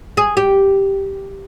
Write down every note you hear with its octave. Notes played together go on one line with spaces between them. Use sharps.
G#4
G4